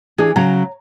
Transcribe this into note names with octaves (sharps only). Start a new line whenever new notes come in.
E3 D4 G#4
C#3 F#3 C#5 A#5